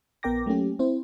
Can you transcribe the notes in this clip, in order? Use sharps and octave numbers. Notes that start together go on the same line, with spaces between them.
A#1 B3 A#4 G5 D6 A#6
F#3 A3 A#3 C#4 G4
C4 E4 C5